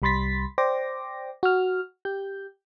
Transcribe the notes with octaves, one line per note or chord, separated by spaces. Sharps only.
C2 G3 B5 C6 A6 B6
C5 D5 G5 C6 D6 A#6
F#4 F6
G4 G6